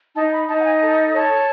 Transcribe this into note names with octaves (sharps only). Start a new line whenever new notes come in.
D#4 A5
B5
D#4 A5
F#5
G#5
A4 A5
C#5 A5